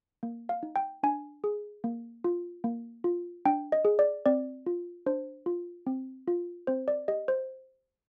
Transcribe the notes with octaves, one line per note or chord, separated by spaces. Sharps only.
A#3
F5
D#4
G5
D4 G#5
G#4
A#3
F4
A#3
F4
D4 G5
D#5
G#4
D5
C4 D5
F4
D4 C5
F4
C4
F4
C4 C5
D5
G4 D#5
C5